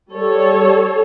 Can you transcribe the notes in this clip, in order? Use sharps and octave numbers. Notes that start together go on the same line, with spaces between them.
G3 A4 C#5